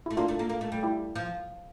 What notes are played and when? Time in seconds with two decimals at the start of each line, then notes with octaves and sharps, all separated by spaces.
0.06 A3 E4
0.17 A#3 D4 F4
0.28 A3
0.39 A#3
0.49 A#3
0.61 A3
0.72 G3
0.83 E4 G4
1.15 F3